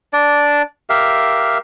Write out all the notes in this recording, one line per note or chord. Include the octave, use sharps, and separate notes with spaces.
D4 D5
G4 A#4 E5 F5